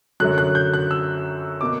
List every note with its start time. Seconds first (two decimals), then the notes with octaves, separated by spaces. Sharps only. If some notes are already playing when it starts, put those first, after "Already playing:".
0.20 F#2 D3 F#3 F#6
0.38 F#6
0.55 G6
0.74 F#6
0.91 E6
1.61 B2 A#3 D6